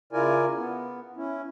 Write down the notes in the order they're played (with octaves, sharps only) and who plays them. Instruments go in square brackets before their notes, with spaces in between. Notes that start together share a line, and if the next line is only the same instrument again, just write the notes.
[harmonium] C#3 E4 F4 A#4 D5 G#5
B3
C#4 E4